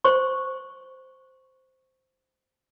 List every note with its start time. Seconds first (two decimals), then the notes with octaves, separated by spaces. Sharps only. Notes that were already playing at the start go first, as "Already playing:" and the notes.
0.04 C5 C#6